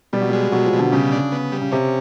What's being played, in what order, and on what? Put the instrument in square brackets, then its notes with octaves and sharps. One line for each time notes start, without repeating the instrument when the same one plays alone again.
[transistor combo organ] B2 [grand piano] G3
[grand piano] F#3
[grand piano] G3 [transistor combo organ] G#3
[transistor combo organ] B2 [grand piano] F#3
[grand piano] F3
[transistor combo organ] B2
[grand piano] D3
[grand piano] C#3 [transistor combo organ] G3
[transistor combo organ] D4
B3
G3
[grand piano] C#3
[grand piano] C3 [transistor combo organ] C#4